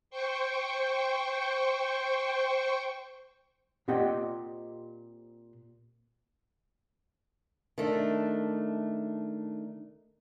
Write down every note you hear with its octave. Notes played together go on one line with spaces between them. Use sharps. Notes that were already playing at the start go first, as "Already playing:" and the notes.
C5 G5 C#6
A#2 C4 G4 D#5 F#5 G5
D#3 A3 D4